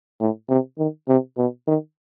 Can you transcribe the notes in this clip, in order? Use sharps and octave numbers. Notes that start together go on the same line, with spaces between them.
A2
C3
D#3
C3
B2
D#3